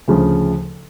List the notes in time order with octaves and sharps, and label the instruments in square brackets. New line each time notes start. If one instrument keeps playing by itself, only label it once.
[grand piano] D2 C#3 F3